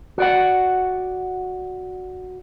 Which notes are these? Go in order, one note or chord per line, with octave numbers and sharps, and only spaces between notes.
F#4 D5 F#5